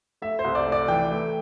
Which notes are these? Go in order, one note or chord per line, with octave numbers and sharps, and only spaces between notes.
A3 E5
C5
C2
D5
A3
D5
E3 G5
A3